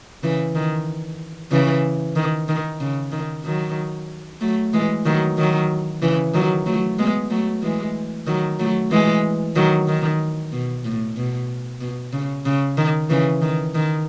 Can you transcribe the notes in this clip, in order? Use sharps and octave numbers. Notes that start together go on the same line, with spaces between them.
C#3 E3
D#3
C#3 E3
D#3
D#3
C#3
D#3
D#3 F#3
F#3 A3
E3 G#3
D#3 F#3
D#3 F#3
C#3 E3
D#3 F#3
F#3 A3
G#3 B3
F#3 A3
E3 G#3
D#3 F#3
F#3 A3
E3 G#3
D#3 F#3
D#3
B2
A2
B2
B2
C#3
C#3
D#3
C#3 E3
D#3
D#3